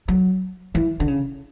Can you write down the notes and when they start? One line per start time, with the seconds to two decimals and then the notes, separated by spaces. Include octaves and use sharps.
0.08 F#3
0.75 E3
1.00 D3
1.08 C#3